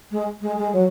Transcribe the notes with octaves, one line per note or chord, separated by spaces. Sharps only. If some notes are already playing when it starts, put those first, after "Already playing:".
G#3
G#3
G#3
F#3